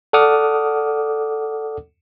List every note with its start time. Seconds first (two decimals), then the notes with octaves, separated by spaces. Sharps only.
0.13 A4 D5 F#5 D6 D#6 F6